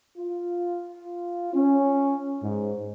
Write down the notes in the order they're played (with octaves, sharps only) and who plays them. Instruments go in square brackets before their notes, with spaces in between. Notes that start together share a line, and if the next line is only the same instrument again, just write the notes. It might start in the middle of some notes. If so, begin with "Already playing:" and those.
[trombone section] F4
C#4
G#2